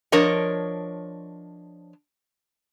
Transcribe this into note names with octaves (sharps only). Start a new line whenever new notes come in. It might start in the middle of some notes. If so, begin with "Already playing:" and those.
F3 D4 A#4 C#5 D#5